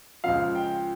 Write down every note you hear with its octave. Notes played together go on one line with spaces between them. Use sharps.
C#2 C#3 F3 F5
G5